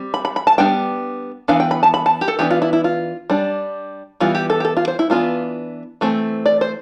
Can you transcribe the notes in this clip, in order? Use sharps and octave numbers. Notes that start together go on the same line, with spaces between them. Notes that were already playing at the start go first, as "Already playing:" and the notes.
Already playing: G3 C4
B5
B5
B5
A5
G3 B3 D4 G5
E3 B3 D4 F5
G5
B5
A5
B5
A5
G4
A4
E3 B3 D4 G4
F4
E4
E4
F4
G3 D4
E3 G3 B3 F4
G4
A4
G4
A4
F4
C5
E4
E3 B3 D4 F4
E3 A3 C4
D5
C5